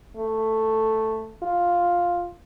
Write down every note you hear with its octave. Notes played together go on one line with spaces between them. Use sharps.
A3
F4